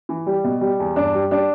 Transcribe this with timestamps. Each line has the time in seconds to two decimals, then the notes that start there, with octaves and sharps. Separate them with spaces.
0.09 E3
0.27 G3
0.44 B2
0.61 G3
0.80 E2
0.96 G2 D4
1.14 G3
1.31 G3 D4